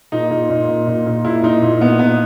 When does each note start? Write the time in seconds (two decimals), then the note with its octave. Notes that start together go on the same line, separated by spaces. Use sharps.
0.12 A#2 D#4
0.31 A#2
0.50 A#2
0.69 A#2
0.87 A#2
1.06 A#2
1.24 A#2 E4
1.43 A#2 D#4
1.62 A#2
1.81 A#2 B3
1.99 A#2 B3